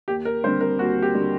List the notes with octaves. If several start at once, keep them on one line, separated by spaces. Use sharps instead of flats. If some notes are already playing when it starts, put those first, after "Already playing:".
D#2 G4
A#4
D3 G3 C4 C5
A#4
D#2 F#4
G4
D3 G3 C4